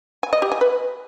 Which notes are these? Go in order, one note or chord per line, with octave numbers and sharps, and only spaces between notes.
G#5
D#5
G4
G#5
B4